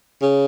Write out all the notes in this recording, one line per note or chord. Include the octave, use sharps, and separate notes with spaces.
C#3